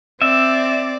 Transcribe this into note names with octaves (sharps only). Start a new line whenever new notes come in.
C4 D5 E5